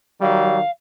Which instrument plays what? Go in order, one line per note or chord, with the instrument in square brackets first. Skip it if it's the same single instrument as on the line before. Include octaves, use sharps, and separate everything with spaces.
[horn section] D#3 F#3 G3 [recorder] F5